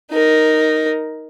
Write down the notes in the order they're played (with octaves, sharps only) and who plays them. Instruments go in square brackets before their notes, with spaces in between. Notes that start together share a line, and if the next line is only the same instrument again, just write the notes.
[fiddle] D#4 A#4